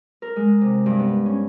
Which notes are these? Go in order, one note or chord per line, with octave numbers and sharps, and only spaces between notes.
A#4
G#3
C3
G2
B3
C#4